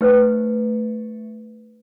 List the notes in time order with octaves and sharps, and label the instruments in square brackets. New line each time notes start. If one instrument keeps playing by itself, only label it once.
[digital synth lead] A3 [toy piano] D#4 B4 C5